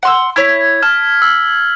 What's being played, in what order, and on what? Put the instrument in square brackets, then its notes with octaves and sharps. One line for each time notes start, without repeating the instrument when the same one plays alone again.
[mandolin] F#5 C6 E6
[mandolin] E4 C#5 [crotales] G#6 B6
[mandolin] A5 [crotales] F6
[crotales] E6